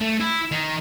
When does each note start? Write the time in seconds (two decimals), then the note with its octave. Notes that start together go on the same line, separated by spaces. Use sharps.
0.01 A3
0.20 E4
0.51 D#3